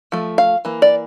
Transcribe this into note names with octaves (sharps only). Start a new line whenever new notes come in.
F3 A3
F5
E3 A#3
D5